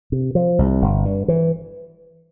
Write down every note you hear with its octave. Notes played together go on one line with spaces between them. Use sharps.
C3
F3
C2
G1
G2
E3